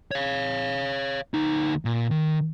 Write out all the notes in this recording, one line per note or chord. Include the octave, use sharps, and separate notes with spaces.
C#5 F5
D2 D#4
A#2
D#3